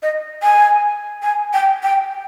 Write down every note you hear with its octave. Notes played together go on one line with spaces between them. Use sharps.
D#5
G#5
G#5
G5
G5